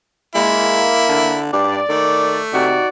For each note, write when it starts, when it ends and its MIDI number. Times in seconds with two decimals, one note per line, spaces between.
0.35 0.95 56
0.35 1.36 58
0.35 1.39 64
1.09 1.52 50
1.53 1.80 43
1.53 2.43 74
1.89 2.39 51
1.89 2.67 57
2.53 2.79 48
2.53 2.88 63
2.53 2.88 66
2.53 2.88 74